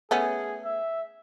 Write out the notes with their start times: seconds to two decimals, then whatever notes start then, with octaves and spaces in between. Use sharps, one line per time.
0.11 A3 B3 C#4 G#4
0.65 E5